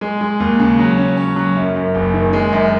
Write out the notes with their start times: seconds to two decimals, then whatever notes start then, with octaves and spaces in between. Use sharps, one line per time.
0.01 G#3
0.21 G#3
0.40 D#2
0.60 C#3
0.79 F#3
0.98 C#4
1.17 C#4
1.36 F#3
1.56 F#2
1.76 F#2
1.95 F#1
2.14 D#3
2.33 G#3
2.53 F#2